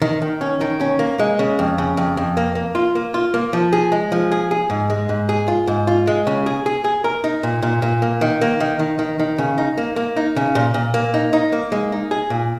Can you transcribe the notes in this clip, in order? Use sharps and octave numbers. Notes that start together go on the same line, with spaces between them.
D#3
D#3
C#4
D#3
C#4
A#3
G#3
C#3
F2
C#3
F2
F2
A#3
A#3
F4
A#3
F4
A#3
F3
G#4
G#3
F3
G#4
G#4
G#2
G#3
G#2
G#4
F4
G#2
F4
G#3
C#3
G#4
G#4
G#4
A#4
D#4
A#2
A#2
A#2
A#3
D#3
A#3
D#3
D#3
D#3
D#3
C#3
D#4
A#3
A#3
D#4
C#3
A#2
A#2
A#3
D#4
D#4
A#3
G#3
D#4
G#4
A#2